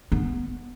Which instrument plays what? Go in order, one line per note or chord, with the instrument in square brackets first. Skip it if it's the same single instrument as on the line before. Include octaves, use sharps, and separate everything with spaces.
[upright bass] B3